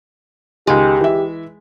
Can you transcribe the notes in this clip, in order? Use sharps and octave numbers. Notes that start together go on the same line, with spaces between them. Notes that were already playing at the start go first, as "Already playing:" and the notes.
C#2 D#3 G#3 G4
E3 E5